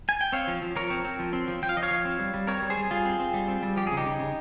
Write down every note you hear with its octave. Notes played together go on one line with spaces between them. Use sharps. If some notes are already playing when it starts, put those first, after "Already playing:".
G#5
G5
C4 C#5 F5
F3
F3
F3 A#4 C#5
C4
C4
F3
C4
F3
F3 G5
F5
F3 D#5
C#5 F5
F3
C4
G3
G3
C4 A#4 C#5
G3
G#4 C5
G3
G3 F4 G#4
C4
C4
G3
C4
G3
F3 G4
C#3 G#4
D#4 G4
C#3
C#3